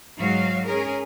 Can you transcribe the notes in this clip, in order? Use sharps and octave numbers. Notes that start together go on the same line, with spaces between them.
G#2 F#3 F#4 F5
C#4 G#4 A#4